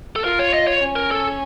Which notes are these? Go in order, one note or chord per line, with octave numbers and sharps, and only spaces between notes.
A4
F4 A#4
C#5
D#5
C#5
C#4
A#4
A4